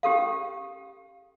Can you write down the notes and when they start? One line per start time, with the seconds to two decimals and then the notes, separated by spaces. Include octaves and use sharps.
0.03 C#4 G4 A4 F5